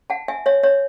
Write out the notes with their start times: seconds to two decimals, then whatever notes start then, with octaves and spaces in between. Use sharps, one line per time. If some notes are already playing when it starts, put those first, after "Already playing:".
0.10 F#5 A5
0.28 E5 G#5
0.46 C#5 E5
0.63 C#5 E5